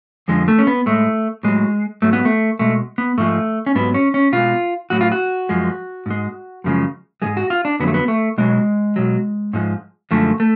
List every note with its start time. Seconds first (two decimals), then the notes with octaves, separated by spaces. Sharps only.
0.28 F2 D3 F3 G#3
0.48 A3
0.59 C#4
0.67 B3
0.86 A2 G#3 A3
1.43 A2 F#3 G#3
2.02 G#2 F#3 A3
2.13 B3
2.25 A3
2.59 B2 G#3 A3
2.98 B3
3.18 G#2 F3 G#3 A3
3.66 C#4
3.75 G#2 F#3 B3
3.94 C#4
4.14 C#4
4.32 B2 G#3 F4
4.90 A2 F#3 F#4
5.01 F4
5.12 F#4
5.49 F#2 F3 G#3
6.06 G#2 G#3
6.64 F#2 C#3 F3 G#3
7.22 G#2 F3 G#3 G#4
7.37 F#4
7.50 F4
7.65 D4
7.80 F2 D3 F#3 B3
7.87 A3
7.94 B3
8.08 A3
8.38 B2 F#3 G#3
8.96 B2 F#3
9.53 G#2 F3 G#3
10.11 F#2 D3 F3 G#3 A3
10.40 A3